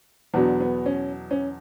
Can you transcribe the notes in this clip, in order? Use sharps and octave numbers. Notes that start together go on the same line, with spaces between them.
E2 B2 F#3 B3 D4
B3
C#4
C#4